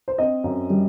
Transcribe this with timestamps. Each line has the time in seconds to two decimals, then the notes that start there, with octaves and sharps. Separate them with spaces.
0.08 C5
0.18 C4 D#5
0.44 F#2
0.70 G3